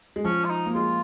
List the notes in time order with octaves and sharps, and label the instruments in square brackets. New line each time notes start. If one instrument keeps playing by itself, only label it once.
[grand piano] G#3
[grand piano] F3 [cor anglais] C#4
[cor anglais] F4
D#4
[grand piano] A#3
[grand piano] G#3 [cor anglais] F4